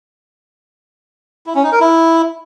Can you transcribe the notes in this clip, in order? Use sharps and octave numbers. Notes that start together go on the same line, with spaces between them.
E4
C#4
D#4
A#4
E4